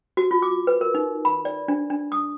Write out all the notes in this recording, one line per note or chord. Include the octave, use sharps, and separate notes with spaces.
F#4
F4
D6
B4
A#4
D#4
B5
D5
D4
D4
D#6